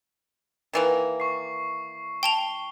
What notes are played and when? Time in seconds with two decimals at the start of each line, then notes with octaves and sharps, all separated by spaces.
0.73 D#3 E3 A#3
1.20 C#6 C7
2.23 G5 A5 F7 G7